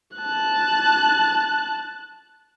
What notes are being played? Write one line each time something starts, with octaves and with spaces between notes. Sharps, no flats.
A5 F#6